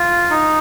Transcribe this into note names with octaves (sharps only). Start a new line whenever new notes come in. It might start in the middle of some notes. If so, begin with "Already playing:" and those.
Already playing: F4
D#4